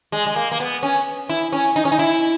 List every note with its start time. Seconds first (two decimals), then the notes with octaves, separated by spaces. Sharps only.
0.12 G#3
0.26 G#3
0.36 A#3
0.51 A#3
0.60 B3
0.83 C#4
1.29 E4
1.52 C#4
1.76 D#4
1.85 C#4
1.92 D#4
1.99 E4